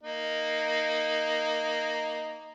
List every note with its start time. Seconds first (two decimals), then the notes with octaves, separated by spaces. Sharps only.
0.04 A#3 D#4